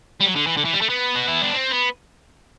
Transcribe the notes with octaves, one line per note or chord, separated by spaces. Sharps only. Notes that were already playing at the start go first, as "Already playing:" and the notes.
G3
F#3
D3
E3
D3
E3
G3
A3
B3
F#4
E4
D4
C4
B3